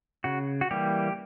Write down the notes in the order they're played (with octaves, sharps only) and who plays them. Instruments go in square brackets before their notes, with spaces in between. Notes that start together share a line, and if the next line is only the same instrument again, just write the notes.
[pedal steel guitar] C#3 F#4
F#4
E3 G3 A#3 G4